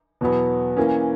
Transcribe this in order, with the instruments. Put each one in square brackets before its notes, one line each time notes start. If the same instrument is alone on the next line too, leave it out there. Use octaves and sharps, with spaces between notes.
[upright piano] E2 B2 F#3 B3
E3 A#3 C#4